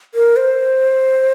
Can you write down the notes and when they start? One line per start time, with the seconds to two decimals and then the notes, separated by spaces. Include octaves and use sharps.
0.15 A#4
0.36 C5